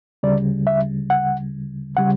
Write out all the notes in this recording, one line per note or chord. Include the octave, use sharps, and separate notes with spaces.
D2 C#3 G3 D5
E5
F#5
C#3 G3 F#5